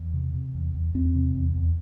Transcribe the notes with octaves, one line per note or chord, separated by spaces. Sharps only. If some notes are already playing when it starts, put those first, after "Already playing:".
Already playing: E2
C3
C3
E2
E2
E2 C4
C3
E2
E2